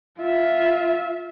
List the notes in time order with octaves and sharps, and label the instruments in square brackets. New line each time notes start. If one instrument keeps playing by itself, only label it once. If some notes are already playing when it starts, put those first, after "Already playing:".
[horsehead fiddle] F4 E5